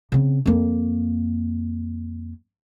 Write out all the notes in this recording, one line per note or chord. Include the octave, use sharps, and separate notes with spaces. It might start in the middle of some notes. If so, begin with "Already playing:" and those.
C#3 C4
F2 A#3